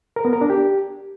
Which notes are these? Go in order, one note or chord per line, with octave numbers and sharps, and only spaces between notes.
A#4
B3
A#4
D4
G4